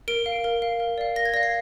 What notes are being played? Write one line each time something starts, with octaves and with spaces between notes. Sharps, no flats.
A#4 D7
F5
A#4
F5
A#4
D5 F5
A#4 A#6
G#6
D5 F5 A#6
C7